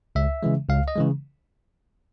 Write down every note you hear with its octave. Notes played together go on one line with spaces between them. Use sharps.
C#2 E5
C#3 E3 G#3
C#2 F5
D#5
C#3 E3 G#3